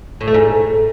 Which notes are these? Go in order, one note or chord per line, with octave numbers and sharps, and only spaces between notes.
A2
A3
G#2